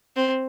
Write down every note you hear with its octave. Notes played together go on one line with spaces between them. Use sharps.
C4